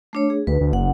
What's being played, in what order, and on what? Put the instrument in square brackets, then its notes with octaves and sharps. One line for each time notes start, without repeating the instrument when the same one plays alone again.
[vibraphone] A3 D4 C#5
G#4
[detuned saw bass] D2 [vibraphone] B4
[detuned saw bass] D2
[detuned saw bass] F#1 [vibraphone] F#5